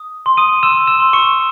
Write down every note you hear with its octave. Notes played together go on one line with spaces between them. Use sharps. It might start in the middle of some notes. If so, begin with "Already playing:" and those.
Already playing: D#6
C6
D#6 D#7
C6 E6 E7
E6 E7
C6
C#6 C#7